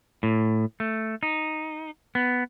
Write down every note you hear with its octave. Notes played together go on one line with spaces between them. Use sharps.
A2
A3
D#4
B3